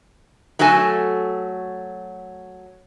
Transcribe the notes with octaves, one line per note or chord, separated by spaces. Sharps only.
F#3 A3 F#4 A4 G#5